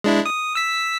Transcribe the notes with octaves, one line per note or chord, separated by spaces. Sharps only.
G#3 D4 E4
D#6
E6 B6